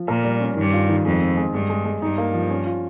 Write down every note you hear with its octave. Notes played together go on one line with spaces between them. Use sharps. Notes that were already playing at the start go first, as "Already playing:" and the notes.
Already playing: F3
A#2 A#4
G3
C#4
G2 D#3
F4
D#3
F2 G#3
C4
G#3
G2 G#3
G#3
G#3
G2 D#4
A#3
F3
C#4
F4